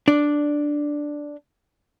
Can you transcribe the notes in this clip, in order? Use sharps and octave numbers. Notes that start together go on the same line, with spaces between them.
D4 D5